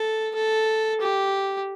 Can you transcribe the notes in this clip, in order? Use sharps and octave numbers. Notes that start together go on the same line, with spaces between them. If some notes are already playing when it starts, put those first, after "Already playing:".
Already playing: A4
A4
G4